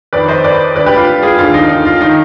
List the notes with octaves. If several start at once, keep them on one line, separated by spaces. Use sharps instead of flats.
F2 D#3 B4 D5
C5 D#5
B4 D5
D2 D3 B4 D5
G4 B4
F4
F4 G#4
D#2 D3 F4
D#4
D#4
F4
D#3 D#4